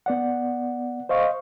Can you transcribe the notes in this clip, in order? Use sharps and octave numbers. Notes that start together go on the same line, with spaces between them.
B3 D5 F#5
C5 D#5 F5 C#6